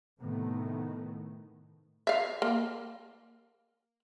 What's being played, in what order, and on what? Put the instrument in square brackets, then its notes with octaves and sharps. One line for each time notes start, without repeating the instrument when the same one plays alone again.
[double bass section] A2 C3 D#3 A3 B3
[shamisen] E5 F5
A#3